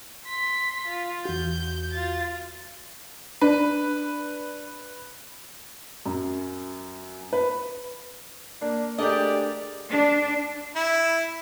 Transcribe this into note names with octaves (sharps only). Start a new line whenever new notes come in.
C6 B6
F4
E2 F#4 G6
F4 A6
D4 B4
F#2
B4
A#3 D4
A3 D4 G4 G#4 A#4 D5 D#5
D4
E4